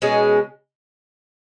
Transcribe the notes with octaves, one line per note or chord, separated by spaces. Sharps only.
B2 G#3 C#4 G#4